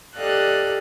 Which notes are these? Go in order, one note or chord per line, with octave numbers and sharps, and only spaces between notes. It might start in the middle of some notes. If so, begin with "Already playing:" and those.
G4 A4 D5 D#5 F5 F#6